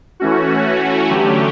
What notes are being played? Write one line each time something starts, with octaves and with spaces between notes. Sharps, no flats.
E3 A3 C#4 F#4
D3 F#3 A3 C#4 G4